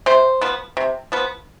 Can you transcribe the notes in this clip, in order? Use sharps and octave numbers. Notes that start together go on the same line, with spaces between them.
C3 C5
F3 B3
C3
F3 B3